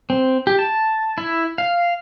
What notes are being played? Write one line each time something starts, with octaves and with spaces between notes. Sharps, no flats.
C4
G4
A5
E4
F5